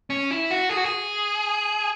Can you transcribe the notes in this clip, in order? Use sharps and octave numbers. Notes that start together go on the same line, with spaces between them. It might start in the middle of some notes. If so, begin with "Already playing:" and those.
C#4
E4
F#4
G#4
F#4
G#4